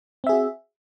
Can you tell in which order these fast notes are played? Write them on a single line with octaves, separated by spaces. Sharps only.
C4 E5 G#4 F#4